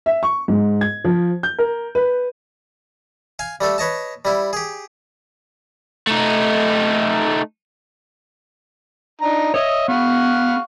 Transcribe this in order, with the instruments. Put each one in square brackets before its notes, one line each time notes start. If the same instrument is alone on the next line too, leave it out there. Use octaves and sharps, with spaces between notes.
[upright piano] E5
C#6
G#2
G#6
F3
G6
A#4
B4
[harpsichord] F5 G#5
G3 A3 A4
B4 C#5 D#5 A5
G3 E4
G4 G#4
[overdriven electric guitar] A3 D#4
[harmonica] D4 D#4 A#5
[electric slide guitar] C#5 [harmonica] D#5 E5
[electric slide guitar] B3 [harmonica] F5 F#5 C#6